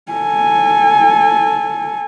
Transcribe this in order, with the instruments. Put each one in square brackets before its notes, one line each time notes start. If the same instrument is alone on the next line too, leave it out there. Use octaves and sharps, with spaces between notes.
[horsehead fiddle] A4 G#5